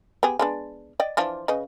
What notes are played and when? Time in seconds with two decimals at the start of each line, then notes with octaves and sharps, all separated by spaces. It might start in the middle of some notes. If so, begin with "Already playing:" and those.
0.23 B3 G4 G#4
0.39 G#3 B3 D4
1.00 D5 D#5 G5
1.17 E3 F3 D4
1.48 C#3 B4 D#5